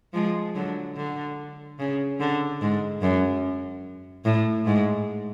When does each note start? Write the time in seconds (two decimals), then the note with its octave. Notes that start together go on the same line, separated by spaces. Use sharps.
0.13 F3 G#3
0.55 D3 F#3
0.96 D3
1.79 C#3
2.20 D3
2.61 G#2
3.02 F#2
4.25 A2
4.66 G#2